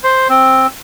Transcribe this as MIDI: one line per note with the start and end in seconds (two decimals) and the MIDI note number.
0.04 0.28 72
0.30 0.67 60